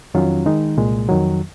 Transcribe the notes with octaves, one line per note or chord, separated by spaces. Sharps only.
F2 D#3 F#3 C#4 F4
D#3 G#3 D#4
C2 A#2 G#3
F2 D#3 F#3